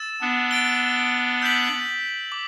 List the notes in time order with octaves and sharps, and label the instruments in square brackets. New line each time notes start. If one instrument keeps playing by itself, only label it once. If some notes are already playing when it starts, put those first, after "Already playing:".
Already playing: [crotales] E6 A6 E7
[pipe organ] B3 D4
[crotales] A6 D7 G7
E6 G6 B6 F#7
D6